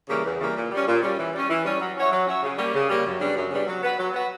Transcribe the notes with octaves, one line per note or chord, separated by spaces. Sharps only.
C#3 E3 G3 A#3
E2
C#3 E3 G3 A#3
A#2
G3 C#4
A#2
G3 C#4
E3
G3 C#4
E3
G3 C#4
F#3
C#4 F#4 C#5 E5
F#3
C#4 F#4 C#5 E5
C#3
G3 A#3 C#4 G4
C#3
G3 A#3 C#4 G4
F#2
C#3 G3 B3 D4
F#2
C#3 G3 B3 D4
F#3
B3 F#4 B4
F#3
B3 F#4 B4